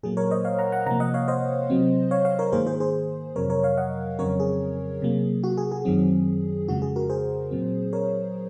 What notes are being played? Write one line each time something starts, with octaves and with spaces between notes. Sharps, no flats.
A#2 F#3 A#3 G#4
A#4 C#5
C5 D#5
C#5 F5
F#5 A#5
F#5 A#5
C3 F3 A#3 F#5 A#5
D#5 F#5
C#5 F5
C5 D#5
C3 F#3 C4
C#5 F5
C#5 F5
A#4 C#5
G#2 D#3 A#3 G#4 C5
G#4 C5
G#4 C5
F2 C3 F#3 A#4 C#5
A#4 C#5
C#5 F5
D#5 F#5
F2 C#3 F#3 C4 A#4 C#5
G#4
C3 F#3 A#3
F#4
G#4
G#4
F#2 D#3 F#3 C4
F2 C#3 G#3 F#4
G#4
F#4 A#4
G#4 C5
A#2 F#3 C4
A#4 C#5